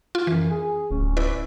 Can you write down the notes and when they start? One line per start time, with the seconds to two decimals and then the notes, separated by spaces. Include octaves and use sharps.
0.15 F4
0.27 F#2 E3
0.51 G#4
0.91 D1 C#4
1.17 E4 B4 D5